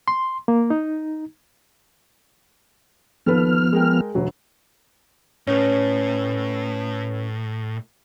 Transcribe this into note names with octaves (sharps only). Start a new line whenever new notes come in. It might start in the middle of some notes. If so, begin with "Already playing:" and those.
C6
A#3
D#4
D#2 F3 B3 A4 B4 F6
G#3 A#4 G5
E1 D2 F#3
A2 C#4 B4 C#5